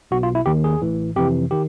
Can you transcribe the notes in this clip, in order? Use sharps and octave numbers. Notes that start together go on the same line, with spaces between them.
B1 B2 F#4
F4
E4
D#2 D#3 G4
G#4
A1 A2 E3
F2 C3 E3 G4
D#3 G4